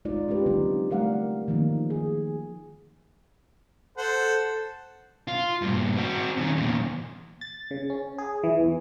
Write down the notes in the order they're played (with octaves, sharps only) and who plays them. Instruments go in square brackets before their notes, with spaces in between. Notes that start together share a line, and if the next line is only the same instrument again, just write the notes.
[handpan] G#3 D#4 F4 D5
C#4 F4 G4 B4
D3 F#3 A#3 C4 D#4
G3 A3 A#4 D5 F5 F#5
D#3 F3 A#3 D#4
G#4
[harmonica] A4 C5 F#5
[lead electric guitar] F4
G2 A#2
C4 F#4
D#3 C#4
E2 A#2
[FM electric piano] A6
C#3
C#4
G#4
E3
E2